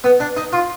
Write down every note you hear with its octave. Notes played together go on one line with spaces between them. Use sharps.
B3
D4
D#4
F4